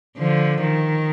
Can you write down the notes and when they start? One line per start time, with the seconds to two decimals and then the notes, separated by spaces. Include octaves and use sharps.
0.18 D3 F3
0.61 D#3